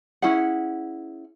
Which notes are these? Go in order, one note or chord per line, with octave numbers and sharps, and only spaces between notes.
C#4 E4 G#4 F#5